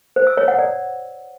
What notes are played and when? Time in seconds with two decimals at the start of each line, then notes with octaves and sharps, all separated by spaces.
0.16 C5
0.27 E6
0.37 C#5
0.48 F#5
0.59 D5